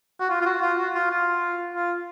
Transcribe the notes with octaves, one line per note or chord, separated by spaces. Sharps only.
F#4
F4
F4
F#4
F4
F#4
F4
F4
F4